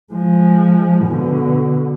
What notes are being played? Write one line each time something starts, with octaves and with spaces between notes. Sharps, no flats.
F3 G#3
B2 D3